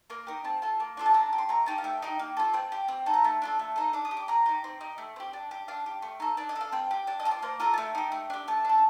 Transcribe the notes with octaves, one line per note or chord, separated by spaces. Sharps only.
A#3 A#4
D#4 G4 A#4
C4 A5
F4 A4
A#3
D4 F4 A4
A5
D4 A#5
G4
C6
A3 A#5
D#4 G4 A5
F5
A3 G5
D#4 G4
A#3
F4 A4
C4 G5
G4
C4
D#4 A4
A#5
A3 A5
D4 F4 A4
A3
D#4 A4
D4 D6
D#6
G4
D6
C4 A#5
D#4 G4
C4
D#4 G4
A3
C4 G4
D4
G4
D4 F5
G4
A3
D#4 A4
D4 D5
D#5
A4
F5
C4 G5
G4
D4
D#5
F4 A4
D5
A#3 C5
F4 A4 A#4
A5
A3 G5
D#4 G4
A3
D4 G4
A3 A5
D4 A4